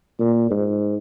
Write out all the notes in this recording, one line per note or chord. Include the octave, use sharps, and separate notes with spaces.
A#2
G#2